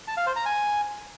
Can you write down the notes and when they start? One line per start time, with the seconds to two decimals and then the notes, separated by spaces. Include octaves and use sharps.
0.08 A5
0.17 F5
0.27 C5
0.36 A#5
0.46 G#5